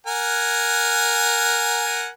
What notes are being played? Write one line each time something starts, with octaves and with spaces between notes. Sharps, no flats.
A#4 F#5 G#5